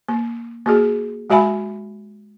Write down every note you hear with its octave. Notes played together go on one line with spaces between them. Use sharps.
A#3
A#3 F#4 G#4
G#3 F#4 E5 G#5 B5